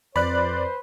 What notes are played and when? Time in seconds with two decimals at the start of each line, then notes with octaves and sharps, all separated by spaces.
0.16 F2 B4 C5 D5 B5 F#6